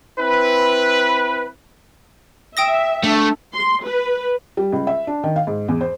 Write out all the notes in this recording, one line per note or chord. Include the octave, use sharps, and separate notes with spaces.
C4 E4 B4
E5 G5 D#6 A#6
A3 D4 A5
C6
B4
G3
C#2
E5
D4
D#3
F5
G#2
E2
C5